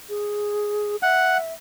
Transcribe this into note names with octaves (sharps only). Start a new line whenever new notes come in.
G#4
E5 F#5